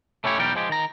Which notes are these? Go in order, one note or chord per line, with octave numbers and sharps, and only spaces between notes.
A3 C#4 E4 G4 C#5
B1 E2 G3 A#4 G5
F3 G#3 G4
D#3 A#5